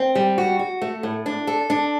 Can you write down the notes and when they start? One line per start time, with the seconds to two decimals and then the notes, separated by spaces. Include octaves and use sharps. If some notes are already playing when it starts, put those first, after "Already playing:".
Already playing: C4
0.15 G3
0.38 F#4
0.59 F#4
0.82 A3
1.03 A2
1.26 D4
1.47 A4
1.70 D4